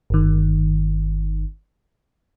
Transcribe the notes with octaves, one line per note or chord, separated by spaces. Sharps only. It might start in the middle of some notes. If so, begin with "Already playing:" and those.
G1 D#3